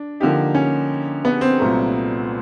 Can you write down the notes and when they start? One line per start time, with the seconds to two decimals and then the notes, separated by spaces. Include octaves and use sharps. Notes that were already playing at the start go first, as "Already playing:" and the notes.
Already playing: D4
0.20 D3 F3 A#3 D#4 G4
0.55 C#4
1.25 B3
1.41 C4
1.59 C2 A#2 F#3 A3